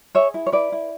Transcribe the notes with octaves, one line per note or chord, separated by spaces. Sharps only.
G#4 C#5 E5
E4
C#5
E4 B4 D5
E4